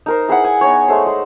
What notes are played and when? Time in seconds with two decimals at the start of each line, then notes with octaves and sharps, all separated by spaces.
0.06 D#4 A#4 C5
0.28 E4 G#4 B4 F#5
0.44 G#5
0.61 B3 D#4 C#5
0.88 G#3 A3 C5
1.06 G#3